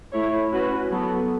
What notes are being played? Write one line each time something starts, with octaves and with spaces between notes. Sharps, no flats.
A3 E4 C#5
C#4 F#4 B4
F#3 B3 A4